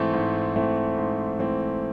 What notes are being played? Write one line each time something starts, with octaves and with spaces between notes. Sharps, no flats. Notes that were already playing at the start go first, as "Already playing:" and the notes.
Already playing: G#2 E3 A3 C4
G#2
E3 A3 C4
G#2
E3 A3 C4